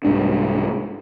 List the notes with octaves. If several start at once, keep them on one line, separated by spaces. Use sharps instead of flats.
C2 G#2 D4